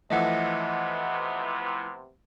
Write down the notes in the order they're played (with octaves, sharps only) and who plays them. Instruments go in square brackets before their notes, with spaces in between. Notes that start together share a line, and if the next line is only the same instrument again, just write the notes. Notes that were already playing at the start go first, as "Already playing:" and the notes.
[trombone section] C3 B3 [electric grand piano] E3 F3 A3 [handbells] D#5 E5 F#5